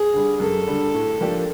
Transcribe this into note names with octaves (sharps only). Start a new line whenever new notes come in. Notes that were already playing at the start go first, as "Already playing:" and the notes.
Already playing: G#4
D3 G3
F#2 A4
D3 G3
A2
F3 A#3 D4 G4